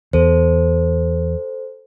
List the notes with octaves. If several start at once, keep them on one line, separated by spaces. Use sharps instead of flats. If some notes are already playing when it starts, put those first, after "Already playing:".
E2 A4 C5